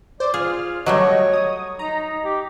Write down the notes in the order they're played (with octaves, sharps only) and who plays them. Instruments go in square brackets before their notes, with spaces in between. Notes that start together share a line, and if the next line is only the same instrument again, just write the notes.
[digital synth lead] C5 [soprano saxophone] D5
[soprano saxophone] F4 [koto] G#4 [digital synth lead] F6
[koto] F#3 G3 A3 [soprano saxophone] C#5 [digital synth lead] D#5
[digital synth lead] D#6
[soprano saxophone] D#4 [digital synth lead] A#5
[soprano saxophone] G4